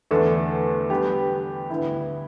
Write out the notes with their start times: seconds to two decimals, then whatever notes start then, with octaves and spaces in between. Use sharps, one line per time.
0.11 E2 D3 A3 D4 A4
0.90 D3 G3 B3 G4
1.70 D2 D3 B3 E4